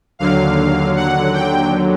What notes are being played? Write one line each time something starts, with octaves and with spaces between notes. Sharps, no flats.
D#2 D3 F#3 F5
F#5
G5